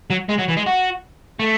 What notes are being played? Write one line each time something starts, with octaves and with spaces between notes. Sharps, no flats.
F#3
G#3
F#3
E3
G#3
F#4
A3